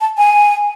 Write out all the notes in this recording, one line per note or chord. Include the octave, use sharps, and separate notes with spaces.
A5
G#5